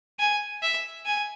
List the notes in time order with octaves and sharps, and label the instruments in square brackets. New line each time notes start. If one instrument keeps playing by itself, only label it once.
[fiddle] G#5
E5
G#5